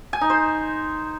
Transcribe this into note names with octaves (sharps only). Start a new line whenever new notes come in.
G#5
D#4
C5